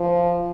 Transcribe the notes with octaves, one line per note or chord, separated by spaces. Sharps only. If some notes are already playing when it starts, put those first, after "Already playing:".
Already playing: F3